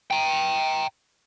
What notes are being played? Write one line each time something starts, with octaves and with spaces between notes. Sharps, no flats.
G5 A#5